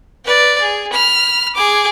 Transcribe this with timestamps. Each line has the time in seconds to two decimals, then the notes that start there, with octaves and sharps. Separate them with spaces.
0.25 B4 D5
0.60 G#4
0.92 B5 F6
1.55 G#4 D6